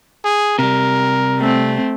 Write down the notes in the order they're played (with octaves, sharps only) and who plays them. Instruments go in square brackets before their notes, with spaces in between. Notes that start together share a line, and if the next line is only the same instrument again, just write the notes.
[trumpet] G#4
[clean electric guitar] C3 G3 [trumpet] A#4
[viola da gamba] A3 C4